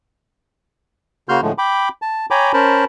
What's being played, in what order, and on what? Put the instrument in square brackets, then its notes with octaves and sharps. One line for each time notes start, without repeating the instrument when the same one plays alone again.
[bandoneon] C#3 A#3 F#4 C6 F6 G6
A2 D3 F3 G#3 A3
G5 B5 D6
A5
C#5 G5 G#5 A#5 B5 D6
C#4 A#4 C5 A5 B5